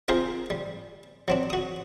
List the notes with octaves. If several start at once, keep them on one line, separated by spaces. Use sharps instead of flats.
C4 F4 G#4 A#4 C5
G3
F#3 C4 D4
F#4 D#6